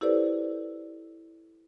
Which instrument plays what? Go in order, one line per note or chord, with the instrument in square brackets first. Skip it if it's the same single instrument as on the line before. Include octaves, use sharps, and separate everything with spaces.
[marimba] E4 G4 A4 B4 C5 D5